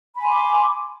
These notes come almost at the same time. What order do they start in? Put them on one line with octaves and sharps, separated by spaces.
B5 G#5 C6 D6